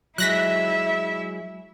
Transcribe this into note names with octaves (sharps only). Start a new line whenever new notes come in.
F#3 G#3 E4 E5 F#6 A#6 B6